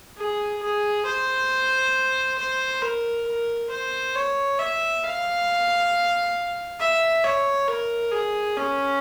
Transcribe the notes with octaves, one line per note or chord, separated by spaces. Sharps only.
G#4
G#4
C5
C5
A#4
A#4
C5
C#5
E5
F5
E5
C#5
A#4
G#4
C#4